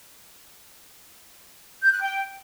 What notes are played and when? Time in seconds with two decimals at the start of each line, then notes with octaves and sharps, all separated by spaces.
1.82 G6
1.92 F#6
2.01 G5